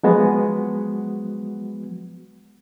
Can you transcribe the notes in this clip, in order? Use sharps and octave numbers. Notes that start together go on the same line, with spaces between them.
F3 F#3 G#3 B3 F#4